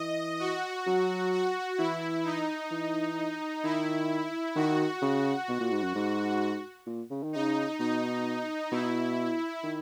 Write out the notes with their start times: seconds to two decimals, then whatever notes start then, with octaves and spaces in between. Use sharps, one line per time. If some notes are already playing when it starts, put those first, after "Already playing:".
Already playing: E3 D#5
0.39 F#4
0.87 F#3
1.32 F#4
1.78 E3 E4
2.24 D#4
2.71 E3
3.63 D#3 E4
4.55 D#3 F#4
5.02 C#3
5.48 B2
5.60 A#2
5.71 G#2
5.83 F#2
5.95 G#2
6.86 A#2
7.10 C#3
7.23 D#3
7.33 C#3 D#4
7.79 B2 D#4
8.71 B2 E4
9.64 D#3